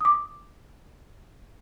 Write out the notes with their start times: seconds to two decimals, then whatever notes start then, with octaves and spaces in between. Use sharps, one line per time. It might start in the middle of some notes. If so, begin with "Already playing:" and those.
0.01 D6 D#6